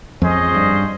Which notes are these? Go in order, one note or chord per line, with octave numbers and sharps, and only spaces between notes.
F2 F3 C#4 G#4 C5 D#5
G2 G3